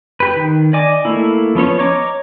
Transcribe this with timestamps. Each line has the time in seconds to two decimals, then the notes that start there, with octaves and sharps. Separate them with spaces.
0.20 G4 B4
0.36 D#3
0.73 D5 D#5 G#5 D6
1.05 A3 A#3 E4
1.55 F3 B3 C#4 C#5
1.79 C#5 D#5 A#5 D6